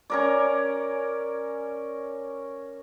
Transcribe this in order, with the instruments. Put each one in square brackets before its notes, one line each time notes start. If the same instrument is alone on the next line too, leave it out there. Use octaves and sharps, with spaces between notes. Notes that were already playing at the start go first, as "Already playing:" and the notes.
[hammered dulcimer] C#4 A#4 D5